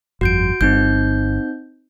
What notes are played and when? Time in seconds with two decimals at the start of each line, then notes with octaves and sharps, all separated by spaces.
0.21 G1 F2 F#4 G6 D7
0.61 G1 C4 D#4 G6